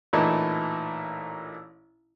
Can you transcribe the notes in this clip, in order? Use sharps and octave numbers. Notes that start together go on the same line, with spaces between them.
A1 A#2 E3 A3 D#4 E4